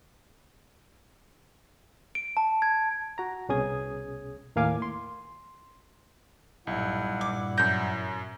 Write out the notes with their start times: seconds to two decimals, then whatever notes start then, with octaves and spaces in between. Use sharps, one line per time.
2.15 D7
2.37 A5
2.62 G#6
3.18 F#4 A#5
3.49 C2 B2 C#4 G#4 D#6 G#6
4.56 D#2 A2 A#3 F5 G#5 D6
4.82 C6
6.67 B1 G2 A#2 G3 E4 F#5
7.21 D6
7.58 F#2 G6 A#6